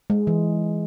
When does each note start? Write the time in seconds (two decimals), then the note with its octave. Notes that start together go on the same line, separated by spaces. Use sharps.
0.10 G#3
0.27 E3